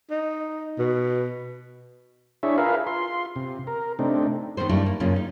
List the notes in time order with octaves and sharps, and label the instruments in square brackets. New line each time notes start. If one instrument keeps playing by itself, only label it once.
[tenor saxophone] D#4
B2
[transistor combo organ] D4 E4 G#4 C#5 E5
F4 G#4 A#4 B4 E5 F5
F4 C6
C3
A#4
C3 A3 C4 D4 D#4
[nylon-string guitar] D#3 A3 B3 C5
G2 G3 A3 A#3 D4 E4
A#3
F#2 A2 C#3 A#3 C#4 F4
D#4